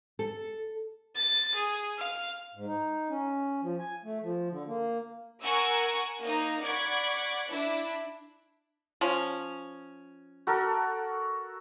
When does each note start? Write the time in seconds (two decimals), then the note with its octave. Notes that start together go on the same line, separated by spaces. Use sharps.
0.19 A4
1.16 A6
1.55 G#4
1.98 F5
2.55 G#2
2.66 D#4
3.10 C#4
3.63 F3
3.80 G#5
4.04 A3
4.22 F3
4.50 D3
4.68 A#3
5.43 A#4 F#5 G#5 C#6 E6
6.20 A#3 D#4
6.62 D5 F#5 B5 C#6 G#6
7.50 D4 E4
9.01 F3 C#4
10.47 F#4 A4 A#4